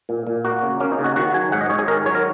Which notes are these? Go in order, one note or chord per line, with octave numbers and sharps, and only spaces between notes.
A#2
A#2
A#3 F#4
C#3
A#3 C#4
D#4
C#3
F#4
D#3 F#4
F#3 G#5
G#2 F#5
D#5
G#2 C#5
G#4
D#3 A#4
F#3 C#5
A#4